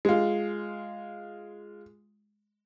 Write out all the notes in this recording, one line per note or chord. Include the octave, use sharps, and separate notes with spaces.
G#3 F4